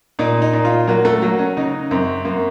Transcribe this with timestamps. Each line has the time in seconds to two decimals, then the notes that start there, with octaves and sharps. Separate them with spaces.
0.19 A#2 D#4
0.42 D#4
0.53 A#2
0.65 F4
0.87 F#3 A#3
1.05 A3
1.22 F#3 A#3
1.39 C#4
1.57 C#3 D#4
1.91 F#2 C4
2.25 F#2 A#3